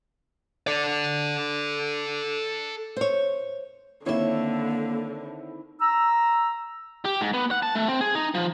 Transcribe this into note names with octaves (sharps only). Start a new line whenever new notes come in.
A4 D5
C5 C#5
D3 D#3 A#3 C4 E4 C#5 E5
A#5 E6
G4
G#2
B3
F#5
A5
A3
C4
G#4
D#4
F3